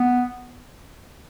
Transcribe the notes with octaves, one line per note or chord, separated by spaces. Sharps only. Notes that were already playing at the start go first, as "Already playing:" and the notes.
Already playing: B3